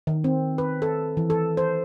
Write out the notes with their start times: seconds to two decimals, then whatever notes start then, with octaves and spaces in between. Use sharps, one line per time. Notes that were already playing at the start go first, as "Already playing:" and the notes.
0.07 D#3
0.24 C4
0.58 B4
0.82 A4
1.17 E3
1.30 A4
1.57 C5